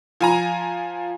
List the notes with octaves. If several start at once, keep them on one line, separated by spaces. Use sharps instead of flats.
F3 G#5 A#5